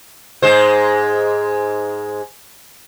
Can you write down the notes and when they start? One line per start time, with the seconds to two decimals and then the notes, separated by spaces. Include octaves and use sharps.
0.42 G#2 G#3 C5